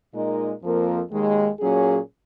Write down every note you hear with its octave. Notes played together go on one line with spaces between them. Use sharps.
A#2 G#3 D#4 A#4 D#5
F2 F3 A#3 F4 A#4
D#2 D#3 G#3
A#2 F#3 A#3 C#4 G#4